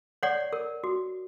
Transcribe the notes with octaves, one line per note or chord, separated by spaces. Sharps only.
C#5 D5 F#5
A#4
F#4